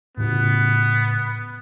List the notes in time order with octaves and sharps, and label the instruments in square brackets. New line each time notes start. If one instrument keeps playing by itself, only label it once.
[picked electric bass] A2 C#3 [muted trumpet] B3